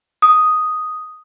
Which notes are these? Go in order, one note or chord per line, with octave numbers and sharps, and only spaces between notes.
D#6